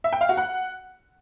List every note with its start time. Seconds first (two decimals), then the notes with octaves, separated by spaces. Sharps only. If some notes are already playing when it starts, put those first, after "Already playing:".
0.04 E5
0.13 G5
0.21 F5
0.29 F#4
0.37 F#5